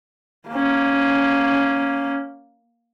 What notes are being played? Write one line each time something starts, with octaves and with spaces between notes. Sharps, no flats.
A#3 C#4